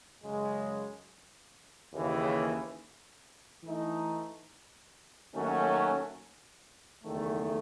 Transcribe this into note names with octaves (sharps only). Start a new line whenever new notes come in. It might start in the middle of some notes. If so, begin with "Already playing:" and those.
F#2 C#3 G#3
D#2 C#3 E3
E3 A3 D#4
D#2 D#3 F#3 A3 C#4
F#1 E2 D#3 A3